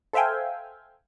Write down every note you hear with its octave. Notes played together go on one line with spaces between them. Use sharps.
A4 C5 E5 F5 G5 G#5